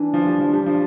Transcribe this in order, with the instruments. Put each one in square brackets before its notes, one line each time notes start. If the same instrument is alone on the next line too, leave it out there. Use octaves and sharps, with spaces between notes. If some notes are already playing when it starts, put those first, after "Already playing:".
Already playing: [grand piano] E3 [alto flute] D4
[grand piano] F3
G3
F3
G3
F3